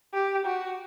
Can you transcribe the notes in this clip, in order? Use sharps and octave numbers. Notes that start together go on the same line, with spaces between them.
G4
F#4